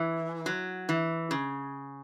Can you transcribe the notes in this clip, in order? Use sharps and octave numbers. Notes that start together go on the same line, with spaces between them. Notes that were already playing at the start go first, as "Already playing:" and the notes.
Already playing: E3
F#3
E3
C#3